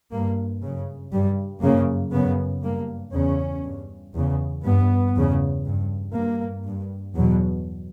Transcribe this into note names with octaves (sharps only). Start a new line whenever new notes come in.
G2 A#3
F#2 C#3
G2 G3
F#2 C#3 A#3
F#2 C#3 B3
G2 A#3
E2 C#3 C#4
G2
E2 C#3
G2 B3
E2 C#3
G2
G2 A#3
G2
E2 B2 F#3